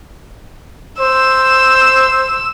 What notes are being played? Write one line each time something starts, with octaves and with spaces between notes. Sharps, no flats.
C5 E6